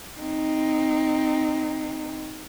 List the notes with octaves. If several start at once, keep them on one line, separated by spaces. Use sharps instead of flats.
C4 D#4